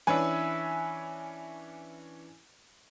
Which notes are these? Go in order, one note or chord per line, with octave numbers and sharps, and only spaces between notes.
E3 C#4 D4 B4 E5 G#5